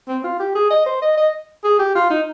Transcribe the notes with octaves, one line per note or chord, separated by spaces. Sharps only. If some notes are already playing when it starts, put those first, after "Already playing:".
C4
F4
G4
G#4
D#5
C5
D#5
D#5
G#4
G4
F4
D#4